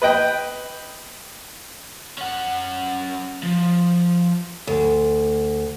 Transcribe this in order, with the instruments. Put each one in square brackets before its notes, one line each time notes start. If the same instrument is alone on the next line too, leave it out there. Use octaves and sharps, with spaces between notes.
[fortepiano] B4 D#5 G5
[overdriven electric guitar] C#4 F#5
F3
[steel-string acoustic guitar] D2